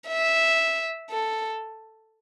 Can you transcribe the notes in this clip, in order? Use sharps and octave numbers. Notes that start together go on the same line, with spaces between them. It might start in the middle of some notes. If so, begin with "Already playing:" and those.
E5
A4